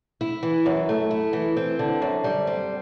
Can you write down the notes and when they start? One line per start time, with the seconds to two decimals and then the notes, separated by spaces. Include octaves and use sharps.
0.21 E4
0.43 E3
0.66 F#2
0.89 A3
1.11 E4
1.33 E3
1.57 C4
1.79 D3
2.02 F#2
2.24 G3
2.47 C4